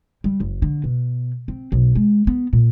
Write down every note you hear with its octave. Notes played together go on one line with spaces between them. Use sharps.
G3
F#1
D3
B2
C4
B1
G#3
B3
A#2